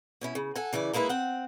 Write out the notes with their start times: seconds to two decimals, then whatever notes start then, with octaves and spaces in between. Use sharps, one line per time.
0.21 B2 C#4 E4
0.35 C#3
0.56 A4 F#5 G#5
0.73 C#3 E3 E4 D5
0.93 G#3 A#3 D#4 E4 B4
1.09 C4 F#5